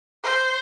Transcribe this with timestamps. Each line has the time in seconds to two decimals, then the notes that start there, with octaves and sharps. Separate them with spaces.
0.23 C5